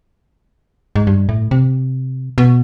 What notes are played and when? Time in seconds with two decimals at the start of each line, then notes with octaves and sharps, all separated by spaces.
0.96 G#2
1.07 G2
1.29 A2
1.51 C3
2.38 B2